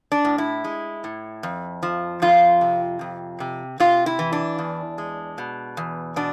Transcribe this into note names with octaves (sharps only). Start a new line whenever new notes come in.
D4
A2
E4
G#3
A2
F2
F3
F2 F4
C3
F2
C3
C3 F4
E4
E3
D4
E2
G#3
B2
E2
B2 D4